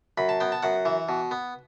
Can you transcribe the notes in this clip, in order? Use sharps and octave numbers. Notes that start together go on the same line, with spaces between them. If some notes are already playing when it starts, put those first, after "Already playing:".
F#2 B5
A5
B3 G5
A5
F#2 F#5
E3
B2
B3